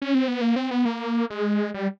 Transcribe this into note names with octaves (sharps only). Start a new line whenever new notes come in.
C#4
C4
B3
A#3
C4
B3
A#3
G#3
G3